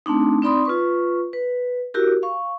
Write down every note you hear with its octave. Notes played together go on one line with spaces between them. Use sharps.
A3 C4 D4 D#4
C4 D#4 D5 B5 C6 D#6
F4 B4 C#6
B4
E4 F#4 G4 A#4
F5 C#6